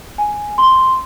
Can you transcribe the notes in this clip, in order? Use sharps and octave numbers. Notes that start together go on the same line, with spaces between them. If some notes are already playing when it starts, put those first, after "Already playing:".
G#5
C6